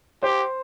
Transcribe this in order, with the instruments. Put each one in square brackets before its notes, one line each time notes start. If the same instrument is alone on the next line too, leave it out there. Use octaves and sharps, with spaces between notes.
[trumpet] G4 [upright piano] C5